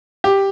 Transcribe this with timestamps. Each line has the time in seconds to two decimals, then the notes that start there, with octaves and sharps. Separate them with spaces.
0.24 G4